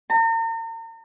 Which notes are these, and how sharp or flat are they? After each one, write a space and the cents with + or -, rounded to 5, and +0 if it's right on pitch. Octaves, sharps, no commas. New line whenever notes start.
A#5 -40